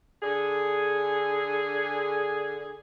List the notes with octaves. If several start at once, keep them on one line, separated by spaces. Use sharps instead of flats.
D3 G#4